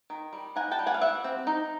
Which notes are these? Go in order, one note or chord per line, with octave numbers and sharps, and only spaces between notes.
D#3
G3
D#4 F#5 G#5
G5 A5
G3
F#5 G#5
F5
G3 E5 F#5
C4
D#4